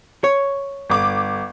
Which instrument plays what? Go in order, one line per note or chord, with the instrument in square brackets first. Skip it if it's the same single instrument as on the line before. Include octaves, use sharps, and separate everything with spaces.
[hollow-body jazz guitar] C#5
[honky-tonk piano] G1 D6